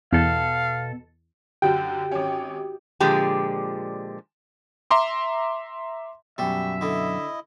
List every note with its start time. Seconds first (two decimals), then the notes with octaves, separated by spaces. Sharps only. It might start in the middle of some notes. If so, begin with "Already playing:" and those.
0.13 E2 B2 A4 F5
1.62 F#2 D3 F#4 G4 G5 G6
2.11 G#1 C#4
3.00 A#2 D3 F3 G#3 G4
4.91 E5 A#5 C6 D6
6.38 F#2 B2 G3 E5
6.81 D3 E4 D#5